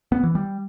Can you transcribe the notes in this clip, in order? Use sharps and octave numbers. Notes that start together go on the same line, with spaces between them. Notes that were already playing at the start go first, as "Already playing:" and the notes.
B3
E3
G3